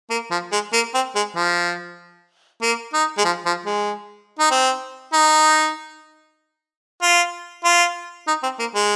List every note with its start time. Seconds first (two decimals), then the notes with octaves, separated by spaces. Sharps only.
0.10 A#3
0.31 F3
0.52 G#3
0.73 A#3
0.94 C4
1.16 G#3
1.36 F3
2.62 A#3
2.94 D#4
3.18 G#3
3.25 F3
3.46 F3
3.66 G#3
4.40 D#4
4.51 C4
5.13 D#4
7.02 F4
7.65 F4
8.28 D#4
8.43 C4
8.59 A#3
8.75 G#3